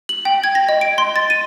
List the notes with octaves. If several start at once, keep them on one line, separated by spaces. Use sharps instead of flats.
F#7
G5
G#6
A#6
D#5
D7
C6
A6
D#7